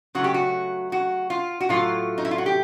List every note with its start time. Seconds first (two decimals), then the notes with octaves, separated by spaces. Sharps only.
0.15 C#3 F#3 A3 F#4
0.24 G4
0.34 F#4
0.92 F#4
1.30 F4
1.60 F#4
1.69 A2 F#3 A3 F4
2.18 D#4
2.25 E4
2.31 F4
2.38 F#4
2.46 G4